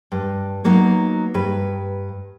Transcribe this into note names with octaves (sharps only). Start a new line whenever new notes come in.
G2
F#3 A#3 B3 D#4
G2 B4